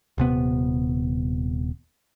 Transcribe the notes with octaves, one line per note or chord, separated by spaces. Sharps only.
D#1 C3 B3